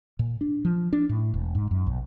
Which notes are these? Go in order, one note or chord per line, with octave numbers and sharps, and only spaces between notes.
A#2
D4
F3
D4
A2
E1
G#2
F#2
B1